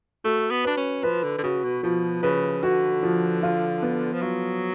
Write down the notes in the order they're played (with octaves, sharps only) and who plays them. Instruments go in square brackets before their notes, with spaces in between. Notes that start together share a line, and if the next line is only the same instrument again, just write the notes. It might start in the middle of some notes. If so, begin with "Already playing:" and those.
[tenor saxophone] A3 [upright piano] F#4
[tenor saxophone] B3
[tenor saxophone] D4 [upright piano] B4
[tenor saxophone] C#4
[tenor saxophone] F3 [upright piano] B4
[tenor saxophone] D3
D3
[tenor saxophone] C#3 [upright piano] F#4
[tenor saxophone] B2
[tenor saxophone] B2 [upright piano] F3
[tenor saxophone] C#3 [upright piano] B4
[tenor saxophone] D3 [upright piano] F#4
[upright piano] F3
F4
B3
[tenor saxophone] F3
[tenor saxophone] F#3 [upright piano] F4